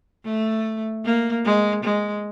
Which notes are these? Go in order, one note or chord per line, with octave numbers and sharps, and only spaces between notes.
A3
A#3
G#3
G#3